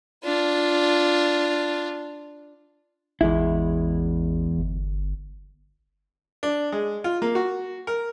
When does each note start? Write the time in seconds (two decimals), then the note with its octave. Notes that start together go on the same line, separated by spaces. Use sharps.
0.24 D4 F4
3.21 A1 E2 G#3 E4
4.57 G1
6.43 D4
6.72 G#3
7.04 F4
7.22 A#3
7.35 F#4
7.87 A#4